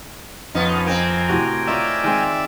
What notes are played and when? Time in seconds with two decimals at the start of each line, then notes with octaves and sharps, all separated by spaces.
0.55 F2 F3 B3 C#4 D#4
0.87 A#3 C4 G5 G#5 A#5
1.29 A2 C3 F#4
1.67 D#4 F4 C#5 D5 E5
2.04 D#3 G#3 C4